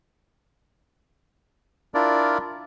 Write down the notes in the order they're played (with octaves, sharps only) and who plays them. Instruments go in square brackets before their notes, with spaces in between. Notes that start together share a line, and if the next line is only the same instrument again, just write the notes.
[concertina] D4 E4 F4 A#4 D5